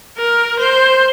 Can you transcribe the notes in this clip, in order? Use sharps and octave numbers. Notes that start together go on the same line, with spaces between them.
A#4
C5